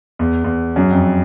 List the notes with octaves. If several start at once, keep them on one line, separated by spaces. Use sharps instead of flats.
E2
E2
F#2
F2